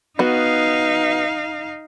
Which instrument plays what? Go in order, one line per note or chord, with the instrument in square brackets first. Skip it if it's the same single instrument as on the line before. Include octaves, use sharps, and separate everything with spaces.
[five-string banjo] B3 F#4 [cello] D#4 F5